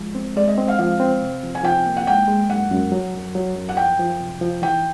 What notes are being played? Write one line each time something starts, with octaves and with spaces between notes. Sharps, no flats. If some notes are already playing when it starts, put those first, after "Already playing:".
Already playing: G#2 F3 G#3
C4
G#3 D5
D#5
C4
F5
F3 F5
C4
C3
F3
G#5
F3 G5
A#3
F#5
G#3 G5
G#3
F#2 F#5
F#2
F#3
F#2
F#3
F#2
F#5
F3 G5
F3
C3
F3
E3 G5